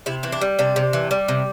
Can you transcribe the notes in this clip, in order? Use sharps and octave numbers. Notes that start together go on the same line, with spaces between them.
C3 E4
E3 C4
D4
G3
C3 D4
C3
E3
G3
C3